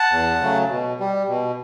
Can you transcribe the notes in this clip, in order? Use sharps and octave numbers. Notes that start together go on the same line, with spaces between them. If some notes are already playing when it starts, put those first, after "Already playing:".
Already playing: F#5 A5
E2
C#3 F#3 A3
B2
G3
B2